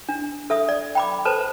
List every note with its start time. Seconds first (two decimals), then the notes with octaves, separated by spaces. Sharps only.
0.09 D4
0.50 A4 E5 D#6
0.69 D5
0.95 G5 B5 D6
1.25 A4 B4 C5 A5